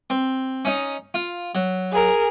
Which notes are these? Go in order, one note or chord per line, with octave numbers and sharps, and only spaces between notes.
C4
C#4 D#4
F4
F#3
G#4 A#4